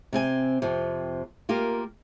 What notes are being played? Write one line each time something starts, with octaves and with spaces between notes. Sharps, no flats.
C3 C4 G#5
F2 C3
A#3 F4 G4 A#4